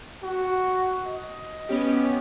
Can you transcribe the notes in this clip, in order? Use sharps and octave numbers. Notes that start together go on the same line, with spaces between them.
F#4
D#5
B3 C#4 G4